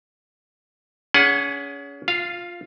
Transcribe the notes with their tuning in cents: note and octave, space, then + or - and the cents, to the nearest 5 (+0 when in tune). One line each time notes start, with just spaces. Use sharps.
C#4 +30 G#4 +0 F#5 -10
F4 +10 F5 -10